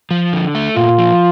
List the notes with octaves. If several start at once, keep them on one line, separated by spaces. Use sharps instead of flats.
F3
D3
A3
A#2 F4
F3